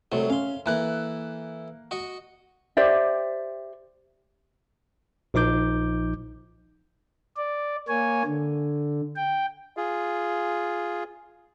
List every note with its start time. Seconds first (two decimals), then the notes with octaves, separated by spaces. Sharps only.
0.12 C2 C3 F#3 A3
0.30 C#4 F5 C6
0.66 E3 A#3 E4 A4 F#6
1.91 F#4 D#5 C#6
2.77 G4 C5 D5 E5
5.34 A#1 F3 D#4 D6 G6
7.36 D5
7.88 A#3 C#5 G#5
8.25 D3
9.16 G5
9.77 F4 G#4